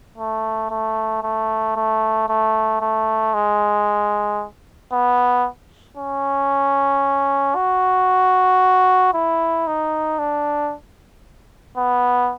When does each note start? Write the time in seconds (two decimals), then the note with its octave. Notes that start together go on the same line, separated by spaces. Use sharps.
0.18 A3
0.71 A3
1.23 A3
1.76 A3
2.29 A3
2.81 A3
3.34 G#3
4.93 B3
5.97 C#4
7.55 F#4
9.14 E4
9.67 D#4
10.19 D4
11.78 B3